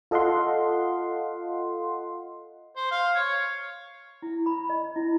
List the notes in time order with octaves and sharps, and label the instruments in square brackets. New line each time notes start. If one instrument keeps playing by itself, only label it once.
[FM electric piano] F4 A4 D#5 F5 F#5 C6
[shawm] C5
F5
C#5
[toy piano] E4
B5
D#5
E4